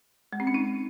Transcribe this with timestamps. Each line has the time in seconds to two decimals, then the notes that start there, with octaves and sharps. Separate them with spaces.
0.33 G#3
0.40 C4
0.47 C#4
0.54 D#4